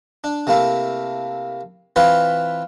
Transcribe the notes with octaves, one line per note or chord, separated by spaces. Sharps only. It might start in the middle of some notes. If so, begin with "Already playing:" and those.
D4
C3 A3 A#3 E4
E3 C4 F4 B4 C#5